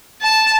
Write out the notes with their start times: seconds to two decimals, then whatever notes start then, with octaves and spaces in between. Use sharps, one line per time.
0.22 A5